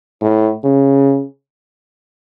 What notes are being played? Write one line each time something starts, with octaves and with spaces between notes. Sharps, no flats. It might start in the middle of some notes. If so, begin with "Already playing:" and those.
A2
C#3